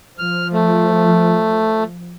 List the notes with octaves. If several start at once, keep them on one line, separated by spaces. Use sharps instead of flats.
F3 F6
A3